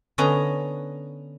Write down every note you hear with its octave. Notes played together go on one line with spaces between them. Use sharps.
D3 B3 C#4 D#5 A#5